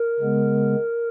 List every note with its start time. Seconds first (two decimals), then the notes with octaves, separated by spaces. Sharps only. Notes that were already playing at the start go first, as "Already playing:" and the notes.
Already playing: A#4
0.20 C#3 G#3 B3